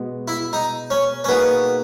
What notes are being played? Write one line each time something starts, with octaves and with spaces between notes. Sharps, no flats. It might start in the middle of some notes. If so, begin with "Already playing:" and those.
Already playing: B2 G#3 B3
E4
D#4
C#4
C#4
B2 A#3 B3 D#4 G#4